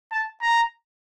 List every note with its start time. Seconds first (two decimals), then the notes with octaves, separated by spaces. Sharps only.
0.11 A5
0.42 A#5